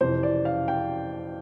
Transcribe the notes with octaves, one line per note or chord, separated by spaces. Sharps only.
F2 C3 E3 C5
D5
F5
G5